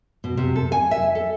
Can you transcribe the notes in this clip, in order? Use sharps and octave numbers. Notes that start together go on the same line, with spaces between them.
B2
C3
A4
G#5
E5
A4